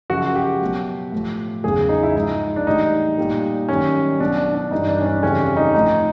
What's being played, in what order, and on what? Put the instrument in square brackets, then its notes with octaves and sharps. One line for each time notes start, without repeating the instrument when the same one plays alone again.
[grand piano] F#2 C#3 F3 F#4
G4
B2 F#3
A2 F3
E2 C#3 F#3 G#4
D#4
E4
G#2 F3 D#4
D4
A2 E3 G3 D#4
A#2 G3
F#2 D#3 G3 C#4
B2 F#3 D4
D4
D4
G2 E3 G3 D#4
D4
C#4
D4
F2 C#3 E3 G3 C#4
D#4
A2 F3 D#4